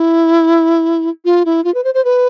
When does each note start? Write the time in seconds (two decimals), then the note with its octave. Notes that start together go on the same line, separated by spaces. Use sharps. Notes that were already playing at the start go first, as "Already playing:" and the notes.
Already playing: E4
1.25 F4
1.45 E4
1.64 F4
1.74 B4
1.84 C5
1.94 C5
2.05 B4